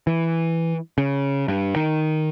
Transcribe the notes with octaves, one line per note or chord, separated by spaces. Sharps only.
E3
C#3
G2
D#3